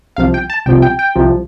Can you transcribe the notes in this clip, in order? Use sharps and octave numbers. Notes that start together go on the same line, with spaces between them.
C2 C3 F3 F5
G5
A5
C2 C3 F3 G5
G5
G5
C2 C3 F3